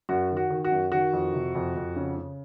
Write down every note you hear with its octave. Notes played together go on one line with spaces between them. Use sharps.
F#2 F#4
D#3
F#4
D#3
F#4
F#2
D#3 F#4
F2
C3
F2
F2
C#3
C#3